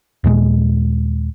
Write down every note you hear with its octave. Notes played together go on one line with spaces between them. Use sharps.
D#2 A#2 G#3